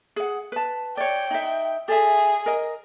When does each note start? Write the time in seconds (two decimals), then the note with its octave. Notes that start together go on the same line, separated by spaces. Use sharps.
0.16 G#4 F#5
0.52 B4 A5
0.97 C#5 D5 G5
1.31 D#4 E5
1.88 G#4 A4 E5
2.46 A#4 D#5